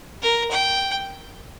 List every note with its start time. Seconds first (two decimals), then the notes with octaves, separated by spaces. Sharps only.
0.22 A#4
0.51 G5